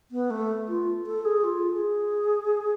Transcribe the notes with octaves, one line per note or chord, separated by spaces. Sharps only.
B3
A3
F4
A4
G#4
F4
G#4